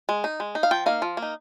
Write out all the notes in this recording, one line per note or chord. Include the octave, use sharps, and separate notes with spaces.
G#3
D#4
G#3
D#4
F5
F3 G5
A#3 D#4 F5
F3
A#3
D#4